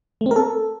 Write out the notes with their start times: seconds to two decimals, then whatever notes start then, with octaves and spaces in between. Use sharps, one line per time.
0.21 A3
0.26 C4
0.31 A#4
0.36 A4